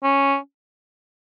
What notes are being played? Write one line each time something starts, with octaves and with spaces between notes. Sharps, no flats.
C#4